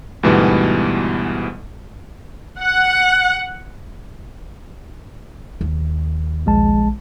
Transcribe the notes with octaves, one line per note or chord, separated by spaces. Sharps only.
D2 G#2 B2 E3 G3 B3
F#5
D#2
A#1 G#3 A5